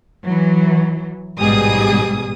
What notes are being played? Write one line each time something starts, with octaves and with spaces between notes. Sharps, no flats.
E3 F#3
A1 G#2 B2 G3 G#4 D#6